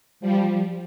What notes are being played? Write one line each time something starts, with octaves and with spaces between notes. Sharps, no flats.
F3 G3